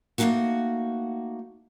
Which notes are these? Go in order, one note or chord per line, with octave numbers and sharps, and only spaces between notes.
A3 A#3 D4 D#4 F#4 F#5